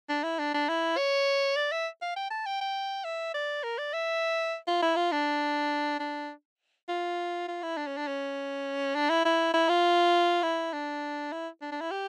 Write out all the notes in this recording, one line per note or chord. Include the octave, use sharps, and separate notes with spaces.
D4
E4
D4
D4
E4
C#5
D5
E5
F5
G5
A5
G5
G5
E5
D5
A#4
D5
E5
F4
E4
F4
D4
D4
F4
F4
E4
D4
C#4
D4
C#4
D4
E4
E4
E4
F4
E4
D4
E4
D4
D4
E4
G4